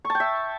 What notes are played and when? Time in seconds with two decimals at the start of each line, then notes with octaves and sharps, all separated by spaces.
0.05 C#6
0.10 A5
0.15 G5
0.20 E5